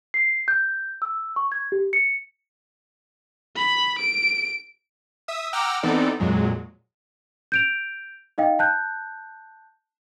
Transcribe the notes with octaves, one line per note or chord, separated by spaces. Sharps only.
C7
G6
E6
C#6
G#6
G4
C#7
B5
D7
E5 D#6 E6
F#5 G5 A#5 D6 E6 F6
E3 B3 C4 D#4 A4 D5
F2 A#2 F#3 G#3
G6 D7 F7
D#4 D#5 F5 G5
A5 F#6 G6